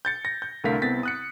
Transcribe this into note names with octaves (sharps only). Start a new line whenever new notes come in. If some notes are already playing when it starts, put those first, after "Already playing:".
G6 A6 C#7
A#6
G6
C2 D3 A3 A#4 F5 B6
C2 B3 C4 A6 B6
D#6 F#6 C#7